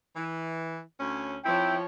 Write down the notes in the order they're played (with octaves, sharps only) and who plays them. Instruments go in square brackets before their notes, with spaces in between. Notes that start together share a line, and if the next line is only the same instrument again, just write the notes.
[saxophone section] E3
D2 C#4
[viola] F3 C#5 [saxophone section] C4 E4 [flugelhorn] G5